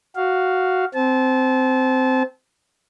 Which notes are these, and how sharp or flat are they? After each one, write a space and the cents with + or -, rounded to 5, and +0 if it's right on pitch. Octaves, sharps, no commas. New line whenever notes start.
F#4 +0 F5 +0
C4 -10 A5 -30